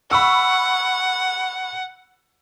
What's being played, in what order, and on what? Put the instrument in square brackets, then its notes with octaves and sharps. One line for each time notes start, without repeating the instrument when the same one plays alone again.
[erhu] F#5 [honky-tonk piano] B5 C#6 E6